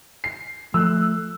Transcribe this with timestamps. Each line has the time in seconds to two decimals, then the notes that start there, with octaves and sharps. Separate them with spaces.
0.24 C7
0.74 F3 A3 E6 F#6